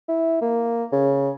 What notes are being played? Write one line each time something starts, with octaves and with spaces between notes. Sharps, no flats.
E4
A#3
C#3